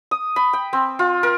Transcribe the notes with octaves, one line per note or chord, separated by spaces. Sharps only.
D#6
B5
G5
C4
F4
A#4